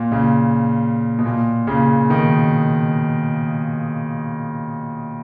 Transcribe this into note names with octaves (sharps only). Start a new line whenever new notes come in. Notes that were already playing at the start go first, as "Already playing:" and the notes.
Already playing: A#2
A#2 C#3
B2
A#2
A#2 C#3
B2 D#3